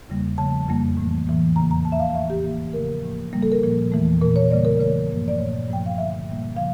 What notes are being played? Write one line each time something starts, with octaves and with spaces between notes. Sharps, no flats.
E2 C#3 G3 A#3
C#3 F3 A3 A5
F2 C#3 G3 A#3
A2 E3 A3
A2 E3 A#3
E2 C#3 E3 A#3 A#5
A#5
A2 F3 A#3 A5
E5
F5
A2 E3 A3 E5
G4
A2 E3 A#3 G4
C#3 F3 A3 A#4
A2 F3 A#3
C#3 G3 A#3
A4
A#4
A#2 F3 A#3
E2 E3 A3
A#2 A3 A#4
C#5
C#3 G3 A#3 D5
A#4
C#3 E3 A3 C#5
G2 F3 A#3
D5
A#2 A3 C#5
G2 F3 A3 G5
F5
G2 D3 F3 A#3 E5
A#2 G3 A#3
C#3 F3 F5